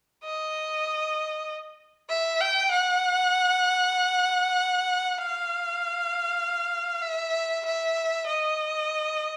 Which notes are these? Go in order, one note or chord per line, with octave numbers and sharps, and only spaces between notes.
D#5
E5
G5
F#5
F5
E5
E5
D#5